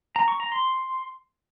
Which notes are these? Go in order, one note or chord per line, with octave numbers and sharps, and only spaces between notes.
A#5
C#6
A#5
C6